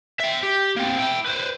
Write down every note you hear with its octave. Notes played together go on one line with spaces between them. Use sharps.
E5 G5
G4
A#3 C4
E4 G5
B4 C5